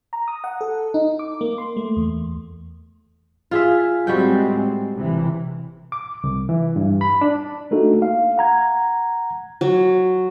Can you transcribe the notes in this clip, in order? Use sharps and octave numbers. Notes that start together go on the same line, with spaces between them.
A#5
D#6
F#5
A4
D#4
D6
A#3
C6
A3
E2
F4 G#4 E5
A2 G3 G#3 C4 F#4 G5
G1 C3 E3
D6
C2
E3
G2
B5
D4
A3 A#3 D4 D#4 F#4 A4
F5
F#5 A#5 G#6
F#3